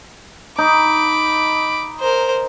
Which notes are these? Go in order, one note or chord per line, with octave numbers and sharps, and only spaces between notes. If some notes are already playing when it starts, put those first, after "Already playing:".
D#4 B5 D6
A#4 C5